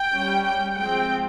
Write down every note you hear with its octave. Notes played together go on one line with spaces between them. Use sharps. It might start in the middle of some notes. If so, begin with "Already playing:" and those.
Already playing: G5
G3 C#4
G5
F3 G#3 C4 G5